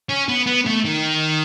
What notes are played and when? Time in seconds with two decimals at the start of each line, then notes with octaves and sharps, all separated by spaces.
0.09 C#4
0.29 B3
0.47 B3
0.66 A3
0.85 D#3